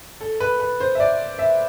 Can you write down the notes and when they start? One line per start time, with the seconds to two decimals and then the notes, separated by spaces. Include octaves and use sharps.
0.21 A4
0.40 B4
0.60 B4
0.80 C5
0.95 E5
1.00 D5
1.39 E5